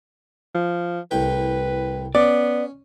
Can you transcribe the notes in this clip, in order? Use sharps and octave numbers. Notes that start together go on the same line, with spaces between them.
F3
C2 A2 B4 G5
B3 C#4 D5